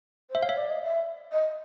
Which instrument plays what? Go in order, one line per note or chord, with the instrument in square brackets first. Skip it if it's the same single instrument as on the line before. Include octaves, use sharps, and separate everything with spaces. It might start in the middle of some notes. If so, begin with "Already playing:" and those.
[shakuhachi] C5 [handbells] E5
[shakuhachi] C#5 [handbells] F5
[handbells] E5
[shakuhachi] D5
D#5
E5
D#5